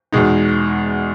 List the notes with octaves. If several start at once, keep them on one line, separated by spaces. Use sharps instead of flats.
E2 B2 G#3 D#4